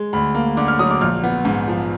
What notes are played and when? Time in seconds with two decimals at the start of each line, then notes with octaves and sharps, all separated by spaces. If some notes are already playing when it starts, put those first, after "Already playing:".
Already playing: G#3
0.13 D2 B5
0.35 A#3
0.57 D3 D6
0.68 F6
0.79 F#3 D#6
0.91 D6
1.01 A#1 F6
1.24 B3
1.45 G#2
1.68 F3